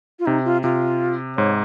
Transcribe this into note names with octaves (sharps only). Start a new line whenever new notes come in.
F4
C3 D#4
F4
C3 F4
G#2 C#5